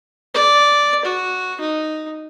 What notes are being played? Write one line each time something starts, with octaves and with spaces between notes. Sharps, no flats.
D5
F#4
D#4